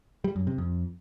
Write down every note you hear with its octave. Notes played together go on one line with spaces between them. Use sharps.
G3
F#2
C3
F2